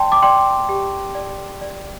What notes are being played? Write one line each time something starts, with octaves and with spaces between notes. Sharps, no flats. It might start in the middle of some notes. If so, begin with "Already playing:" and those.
Already playing: D5 G5 A5 C6
D6
D5 G5 C6
G4
D5
D5